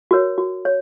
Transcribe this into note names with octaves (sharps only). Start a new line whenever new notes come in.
F#4 A#4 C#5
F#4
C#5